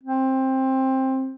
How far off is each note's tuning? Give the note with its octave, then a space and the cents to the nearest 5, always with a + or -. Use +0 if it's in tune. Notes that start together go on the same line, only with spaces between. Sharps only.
C4 +15